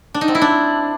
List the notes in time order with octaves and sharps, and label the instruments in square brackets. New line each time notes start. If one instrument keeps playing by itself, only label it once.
[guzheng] D4
D#4
C4
E4
D4